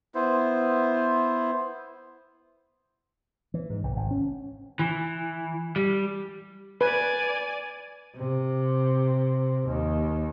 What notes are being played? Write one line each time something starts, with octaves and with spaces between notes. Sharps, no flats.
B3 E4 C5
E3
G#2
C2
G#1
C#4
E3
G3
B4 D5 G#5
C3
D#2